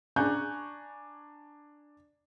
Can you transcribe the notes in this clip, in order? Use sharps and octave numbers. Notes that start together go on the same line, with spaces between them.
D4 G#5 A#5 C#6 F#6 G6